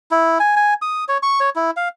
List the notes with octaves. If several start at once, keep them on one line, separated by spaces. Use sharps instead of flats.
E4
G#5
G#5
D#6
C#5
C#6
C#5
E4
F5